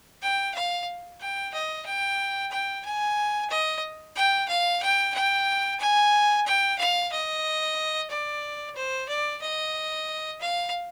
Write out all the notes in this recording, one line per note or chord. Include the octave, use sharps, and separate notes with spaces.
G5
F5
G5
D#5
G5
G5
G#5
D#5
G5
F5
G5
G5
G#5
G5
F5
D#5
D5
C5
D5
D#5
F5